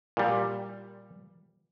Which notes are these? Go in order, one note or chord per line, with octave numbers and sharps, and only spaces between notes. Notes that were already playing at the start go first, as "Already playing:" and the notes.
A#2 G3